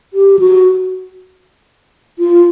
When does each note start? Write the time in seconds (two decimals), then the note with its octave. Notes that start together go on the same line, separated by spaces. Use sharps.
0.13 G4
0.39 F#4
2.19 F4